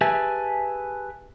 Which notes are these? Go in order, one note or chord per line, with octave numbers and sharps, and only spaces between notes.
G4 G#4 B4 E5 G#5 A5